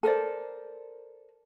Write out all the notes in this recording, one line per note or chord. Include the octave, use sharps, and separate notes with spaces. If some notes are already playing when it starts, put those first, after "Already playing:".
A4 A#4 C5 D5